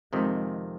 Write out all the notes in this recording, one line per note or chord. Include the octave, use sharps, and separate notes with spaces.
F2 C3 D#3 G#3